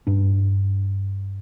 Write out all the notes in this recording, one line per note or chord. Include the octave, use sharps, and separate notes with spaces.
G2 D4